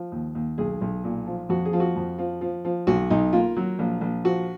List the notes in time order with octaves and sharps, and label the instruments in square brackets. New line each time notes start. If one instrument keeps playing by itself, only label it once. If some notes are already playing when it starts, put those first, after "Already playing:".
Already playing: [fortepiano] F3
D#2
D#2
B1 G#4
B1
A#2
F3
F2 F#4
G#4
F3
F#4
F2
F3
F3
F3
B1 F#4
B1 D#4
A#3 F4
F#3
A#1
A#1
F3 F#4